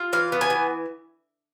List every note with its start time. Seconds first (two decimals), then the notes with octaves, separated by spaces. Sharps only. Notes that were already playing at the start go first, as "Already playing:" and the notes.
Already playing: F4
0.13 E3 F5
0.32 B3
0.41 G#5
0.50 E3